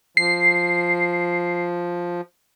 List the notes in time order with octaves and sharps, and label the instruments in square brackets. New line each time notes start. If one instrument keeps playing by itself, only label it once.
[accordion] F3 [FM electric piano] C7